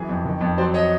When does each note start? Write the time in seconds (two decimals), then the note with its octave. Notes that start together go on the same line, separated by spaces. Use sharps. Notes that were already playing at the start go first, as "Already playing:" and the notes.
Already playing: F#2 E3 G#4
0.09 F2
0.25 D#3
0.41 F2
0.58 F#3 C5 D5
0.74 C#5 D#5